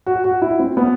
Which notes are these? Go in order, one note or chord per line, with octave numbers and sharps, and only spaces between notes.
F#4
F#4
E4
C4
B3